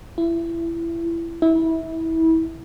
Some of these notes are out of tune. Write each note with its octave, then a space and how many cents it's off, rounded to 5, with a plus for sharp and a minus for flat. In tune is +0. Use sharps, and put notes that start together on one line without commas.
E4 +25
E4 -25